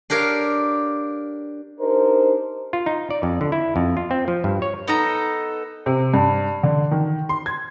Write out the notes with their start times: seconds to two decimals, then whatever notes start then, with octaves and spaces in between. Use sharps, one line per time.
0.10 D4 G4 A#4 C#5 F5
1.80 D4 D#4 G4 A#4 C5
2.73 F4
2.86 D#4
3.11 D5
3.23 F2
3.41 D3
3.52 E4
3.76 F2
3.97 F4
4.11 C4
4.28 F3
4.44 G2
4.62 C#5
4.88 B3 D#4 A4 A#5
5.86 C3
6.14 G2
6.63 D3
6.91 D#3
7.29 C6
7.46 G#6